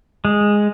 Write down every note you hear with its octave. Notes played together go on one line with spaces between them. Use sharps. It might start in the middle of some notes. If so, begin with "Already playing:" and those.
G#3